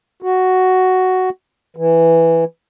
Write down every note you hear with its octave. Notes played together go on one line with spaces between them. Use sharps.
F#4
E3